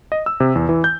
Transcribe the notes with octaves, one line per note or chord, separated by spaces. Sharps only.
D#5
E6
C3
E2
E3
G6